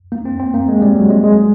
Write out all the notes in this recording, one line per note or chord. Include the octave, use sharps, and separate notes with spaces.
A#3
C4
C4
A#3
G#3
G3
F#3
G#3
G#3